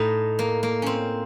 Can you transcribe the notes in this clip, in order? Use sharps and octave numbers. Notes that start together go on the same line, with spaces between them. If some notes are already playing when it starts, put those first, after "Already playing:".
Already playing: A2 D#4
A#3
A#3
C4 C#4